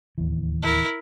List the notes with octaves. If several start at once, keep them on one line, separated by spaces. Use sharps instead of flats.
D1 D#2 E3
E4 A#4